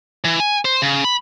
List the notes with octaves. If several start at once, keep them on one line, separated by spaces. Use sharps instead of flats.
E3
G#5
C5
C#3
B5